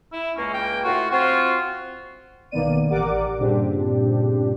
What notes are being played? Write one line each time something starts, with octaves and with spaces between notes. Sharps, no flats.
E4
C#2 A#3 C#4
G5
A2 A3 F4 F#4
C4 F4 F#4
B1 D#3 A#3 B3 D5 D#7
A1 G4 A#4 D5 F#5 D6
G2 A#2 C#3 C4 D4 G4